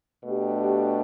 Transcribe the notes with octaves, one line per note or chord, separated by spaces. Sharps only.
B2 A3 D4 G4